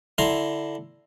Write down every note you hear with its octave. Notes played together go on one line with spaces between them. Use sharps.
D3 E4 A#5 C6